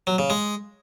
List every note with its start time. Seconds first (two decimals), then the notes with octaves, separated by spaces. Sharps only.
0.07 F#3
0.18 C#3
0.30 G#3